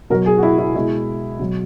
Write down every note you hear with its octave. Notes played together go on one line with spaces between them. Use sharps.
B2 F#3 A#4
G#4
F#4
E4
E4
B2 G#3 E4
B2 F#3